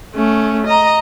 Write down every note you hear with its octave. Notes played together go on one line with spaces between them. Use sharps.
A3 C#4
D#5 A#5